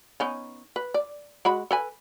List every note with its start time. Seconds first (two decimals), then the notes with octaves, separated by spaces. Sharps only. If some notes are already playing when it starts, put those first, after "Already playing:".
0.20 B3 C#4 D#4
0.76 B4
0.94 D5
1.45 G#3 F#4 B5
1.71 A4 B4 G#5